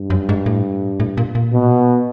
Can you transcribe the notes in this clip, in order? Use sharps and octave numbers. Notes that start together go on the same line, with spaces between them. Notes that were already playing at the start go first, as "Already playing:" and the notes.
Already playing: G2
F#2
G#2
A2
A2
A#2
A#2
B2